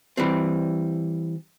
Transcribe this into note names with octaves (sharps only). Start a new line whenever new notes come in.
E3 G3 C4